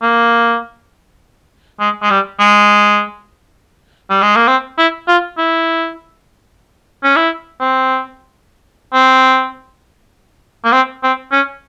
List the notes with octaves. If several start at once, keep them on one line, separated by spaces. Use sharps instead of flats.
A#3
G#3
G#3
G3
G#3
G3
G#3
A#3
C4
E4
F4
E4
C#4
E4
C4
C4
A#3
C4
C4
C#4